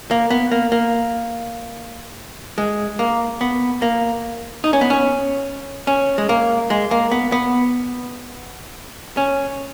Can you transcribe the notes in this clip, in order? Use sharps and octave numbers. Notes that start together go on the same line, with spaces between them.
A#3
B3
A#3
A#3
G#3
A#3
B3
A#3
D#4
C#4
B3
C#4
C#4
G#3
A#3
G#3
A#3
B3
B3
C#4